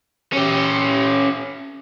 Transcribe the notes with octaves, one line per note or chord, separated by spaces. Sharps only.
C#4 G4